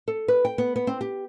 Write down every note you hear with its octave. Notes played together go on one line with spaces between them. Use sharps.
A4
B4
G5
B3
B3
C4
G4